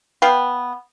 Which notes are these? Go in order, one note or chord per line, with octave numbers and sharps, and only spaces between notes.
B3 F5 G5